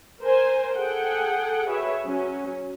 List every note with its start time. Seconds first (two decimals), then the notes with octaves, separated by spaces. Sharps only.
0.22 A#4 C5 G#5
0.74 G#4 A4 F#5 G5
1.67 F#4 G#4 B4 C#5 E5
2.06 F#3 C#4